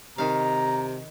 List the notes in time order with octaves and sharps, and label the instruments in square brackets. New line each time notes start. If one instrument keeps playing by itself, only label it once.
[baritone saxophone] C3 [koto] D#3 F5 [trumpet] A#5